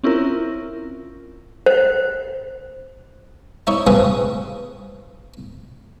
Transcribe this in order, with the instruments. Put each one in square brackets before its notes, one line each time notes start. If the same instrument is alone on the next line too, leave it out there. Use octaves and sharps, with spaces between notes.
[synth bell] C4 C#4 E4 F4 A#4
[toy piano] C5
[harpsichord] D#4 E4 C#5
G2 C#3 C4 G#4 B4 D#6